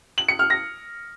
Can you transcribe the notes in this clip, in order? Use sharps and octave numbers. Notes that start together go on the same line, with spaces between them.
F#7
C#7
F6
A#6